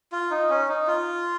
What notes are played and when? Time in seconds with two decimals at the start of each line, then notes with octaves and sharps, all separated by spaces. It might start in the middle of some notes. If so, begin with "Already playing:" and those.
0.12 F4
0.31 D#4
0.49 C#4
0.68 D#4
0.87 F4